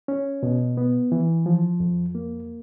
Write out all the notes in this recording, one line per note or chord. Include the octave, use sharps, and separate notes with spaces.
C#4
B2
B3
E3
F3
F2
A#3